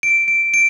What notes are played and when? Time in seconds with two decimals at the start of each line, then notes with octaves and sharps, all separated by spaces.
0.03 D7
0.28 D7
0.54 D7